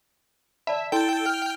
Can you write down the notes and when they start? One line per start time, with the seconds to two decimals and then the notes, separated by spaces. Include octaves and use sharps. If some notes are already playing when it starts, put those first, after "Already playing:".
0.67 D5 E5 A5 B5
0.92 E4 A4 G5 C6
1.26 F6